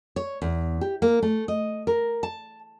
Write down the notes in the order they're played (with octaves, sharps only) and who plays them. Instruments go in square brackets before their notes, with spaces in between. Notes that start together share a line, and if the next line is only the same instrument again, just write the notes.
[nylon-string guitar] C#5
E2
G4
A#3
A3
D#5
A#4
A5